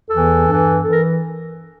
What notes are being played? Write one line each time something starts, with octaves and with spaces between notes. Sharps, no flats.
E2 E3 A4
G2 E3
E3 A4
A#4